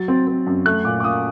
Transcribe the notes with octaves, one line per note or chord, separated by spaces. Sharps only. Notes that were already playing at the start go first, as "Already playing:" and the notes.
Already playing: F#3 A6
C4
C4
F#2
A3 F#6
A#2 D6
D6
A#2 D#6